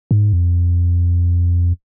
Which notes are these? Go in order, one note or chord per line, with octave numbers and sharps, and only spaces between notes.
G#2
F2